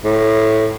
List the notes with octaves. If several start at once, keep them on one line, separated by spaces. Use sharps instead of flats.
A2